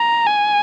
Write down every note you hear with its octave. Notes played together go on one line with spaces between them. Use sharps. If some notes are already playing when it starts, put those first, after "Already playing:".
Already playing: A#5
G#5